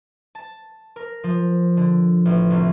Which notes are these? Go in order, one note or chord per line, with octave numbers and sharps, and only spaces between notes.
A5
A#4
F3
D3
A1
C2